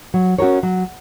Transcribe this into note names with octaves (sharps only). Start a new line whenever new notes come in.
F#3
C#4 F#4 A#4 C#5
F#3